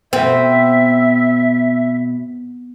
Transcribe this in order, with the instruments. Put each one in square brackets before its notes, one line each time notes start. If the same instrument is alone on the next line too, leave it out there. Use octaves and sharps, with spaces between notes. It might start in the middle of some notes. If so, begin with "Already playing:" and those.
[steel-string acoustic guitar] B2 [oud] C4 [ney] E5